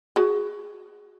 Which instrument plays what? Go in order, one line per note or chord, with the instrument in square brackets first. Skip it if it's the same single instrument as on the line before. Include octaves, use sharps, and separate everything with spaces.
[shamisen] F#4 G#4